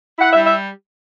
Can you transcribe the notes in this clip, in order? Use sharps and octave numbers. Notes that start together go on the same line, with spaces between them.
E4 F#5
E5
G3
E5